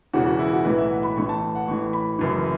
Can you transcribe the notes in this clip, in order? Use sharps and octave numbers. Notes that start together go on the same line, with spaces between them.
E1 E2 C#3 E3 F#4
F#4
E4
F#4
B1 A2 E3 B4
E5
F#5
B5
A1 A2 E3 C#6
A5
F#5
A1 A2 E3 C#6
B5
F#1 F#2 E3